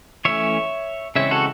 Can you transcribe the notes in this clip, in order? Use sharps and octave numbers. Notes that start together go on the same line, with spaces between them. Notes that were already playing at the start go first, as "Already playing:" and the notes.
E3 A3 C#4 C#5 E5
C#3 E3 G#3 C4 C#5 E5
F#4 A4